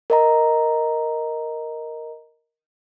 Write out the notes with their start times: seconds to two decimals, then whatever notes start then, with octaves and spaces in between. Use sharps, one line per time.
0.10 A#4 D#5 A#5